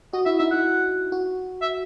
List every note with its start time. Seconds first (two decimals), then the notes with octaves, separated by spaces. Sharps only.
0.13 F#4 D#5
0.25 E4 E5
0.39 D#4 E5
0.51 E4 F#5
1.12 F#4
1.62 E5